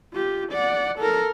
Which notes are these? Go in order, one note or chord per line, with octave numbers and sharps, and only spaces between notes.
F4 G4
D5 F#5
A4 A#4